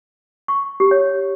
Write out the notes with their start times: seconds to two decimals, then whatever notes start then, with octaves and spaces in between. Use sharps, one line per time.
0.48 C#6
0.80 G4
0.91 C#5